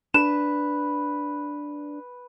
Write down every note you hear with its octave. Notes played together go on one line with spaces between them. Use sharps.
D4 B4 E7